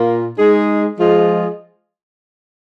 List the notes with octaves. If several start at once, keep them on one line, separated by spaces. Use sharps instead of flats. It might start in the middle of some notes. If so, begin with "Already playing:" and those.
Already playing: A#2 A#3 F4
G#3 D#4 G#4
F3 G#3 F4 G#4 D#5